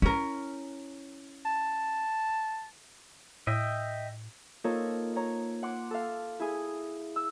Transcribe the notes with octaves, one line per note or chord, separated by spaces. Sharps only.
C#4 E4 A#4
A5
A2 D#5 E5 G5
A#3 D#4 F4 A4 A#4 C#5
C#5 A#5
F#5 C6 D6
A4 F5
E4 G#4
E6